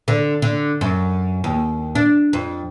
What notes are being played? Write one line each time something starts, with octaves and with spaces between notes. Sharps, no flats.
D3
D3
F#2
D#2
D4
F2